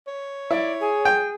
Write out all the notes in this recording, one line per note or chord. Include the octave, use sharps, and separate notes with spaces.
C#5
E4 D5
G#4
G5